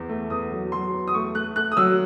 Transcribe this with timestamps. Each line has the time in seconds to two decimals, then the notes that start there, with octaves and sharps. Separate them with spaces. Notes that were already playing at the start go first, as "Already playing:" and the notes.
Already playing: E2
0.09 A3
0.30 E2 D#6
0.52 F#3
0.72 F#3 C6
0.93 E2
1.08 D#6
1.14 A3 C#6
1.35 A3 F#6
1.55 A3 F#6
1.72 D#6
1.77 F#3 E6